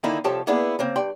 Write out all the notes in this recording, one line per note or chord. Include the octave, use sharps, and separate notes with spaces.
D3 D#3 A#3 D#4 E4
C2 F3 G4 A4 C#5 A5
A#3 B3 D4 E4 G#4 B4
C#3 A#3 C4
G2 D5 G5 C6